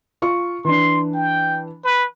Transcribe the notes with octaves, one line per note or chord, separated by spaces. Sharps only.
F4 C#6
E3 D4 C6
G5
B4